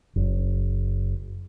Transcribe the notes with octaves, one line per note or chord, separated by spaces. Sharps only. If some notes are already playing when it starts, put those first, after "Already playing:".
F#1